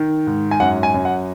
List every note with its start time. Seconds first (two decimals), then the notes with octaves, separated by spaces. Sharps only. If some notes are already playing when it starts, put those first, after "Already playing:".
Already playing: D#3
0.27 G#2
0.51 G#5
0.60 F#2 F#5
0.83 G#5
0.94 F#2
1.05 F#5